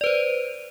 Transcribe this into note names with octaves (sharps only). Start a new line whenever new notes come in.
B4 C5 D5